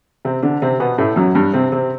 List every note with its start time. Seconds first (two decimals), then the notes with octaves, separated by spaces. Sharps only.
0.25 C3 C4
0.43 D3 D4
0.62 C3 C4
0.80 B2 B3
0.98 A2 A3
1.16 F#2 F#3
1.35 G2 G3
1.53 C3 C4
1.72 C3 C4